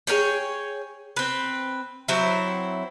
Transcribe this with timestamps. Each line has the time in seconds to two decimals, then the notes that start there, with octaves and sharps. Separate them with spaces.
0.07 G#4 B4 C#5 G5
1.16 C4 B4
2.08 F#3 C4 E4